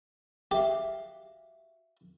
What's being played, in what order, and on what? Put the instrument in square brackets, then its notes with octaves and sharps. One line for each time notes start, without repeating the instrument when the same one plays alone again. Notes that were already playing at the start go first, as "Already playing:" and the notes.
[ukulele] F#4 E5 F5 [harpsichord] G4